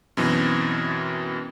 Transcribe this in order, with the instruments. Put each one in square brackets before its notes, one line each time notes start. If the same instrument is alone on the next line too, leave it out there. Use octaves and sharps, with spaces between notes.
[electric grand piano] F#2 B2 E3 C4